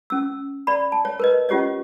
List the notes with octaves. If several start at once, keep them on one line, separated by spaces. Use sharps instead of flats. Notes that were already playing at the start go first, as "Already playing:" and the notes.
C#4 E6
D5 B5
A5
C#5
A#4 B4 D#5
C#4 F4 G4 C#5 D#5